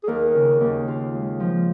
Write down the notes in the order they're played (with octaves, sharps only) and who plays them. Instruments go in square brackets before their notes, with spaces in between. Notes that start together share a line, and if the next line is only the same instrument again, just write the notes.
[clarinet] G#4
[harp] D#2 [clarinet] A#4
[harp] C#3
D#2
F4
G#3
F3